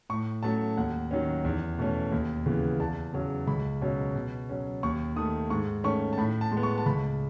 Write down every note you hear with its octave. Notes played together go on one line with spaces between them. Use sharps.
A2 C#6
F#3 A3 C#4 A5
D#2 F#5
D#3 F#3 C#4
E2
B2 A3 C#4
D#2
C#3 E3 B3
E2 A5
C#3 F#3 C#4
C#2 B5
B2 F#3 C#4
B2
F#3 C#4
D#2 C#6
D#3 A3 D#6
G#2 C#6
D#3 A3 C#4 C#6
A5
A2 B5
A5
G#3
B3
C#6
A5
C#2 B5